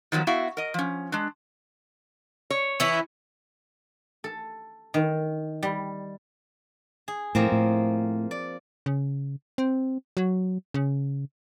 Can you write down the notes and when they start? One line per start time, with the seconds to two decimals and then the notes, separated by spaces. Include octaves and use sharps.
0.12 D#3 F3 F#3 G#3 B3
0.27 B3 E4 F#4 E5 F5
0.57 A#4 D#5
0.74 F3 C#4
1.12 G#3 D4
2.50 C#5
2.80 E3 C#4 E4
4.24 A4
4.94 D#3
5.63 G3
7.08 G#4
7.35 A2 F3 A#3 C4
7.52 A2
8.31 D5
8.86 C#3
9.58 C4
10.17 F#3
10.74 C#3